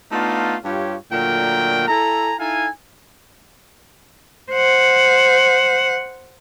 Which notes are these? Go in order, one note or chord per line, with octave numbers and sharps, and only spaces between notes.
A3 B3 D4 D#4 F4
G2 F4 G4 C#5
A#2 D3 F#3 A3 A#4 G5
E4 A4 G#5 A#5
D#4 E4 A4 F5 G#5
C5 F#5